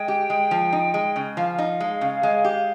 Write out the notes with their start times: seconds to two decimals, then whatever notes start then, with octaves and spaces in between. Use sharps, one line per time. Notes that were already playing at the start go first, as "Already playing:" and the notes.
Already playing: G#3 G5
0.08 G4
0.30 G#3
0.51 F3
0.73 D#4
0.94 G#3
1.16 C#3
1.37 F3 F5
1.58 D#4
1.80 G#3
2.01 C#3
2.23 G#3
2.44 G4